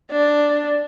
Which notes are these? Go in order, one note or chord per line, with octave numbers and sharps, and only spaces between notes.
D4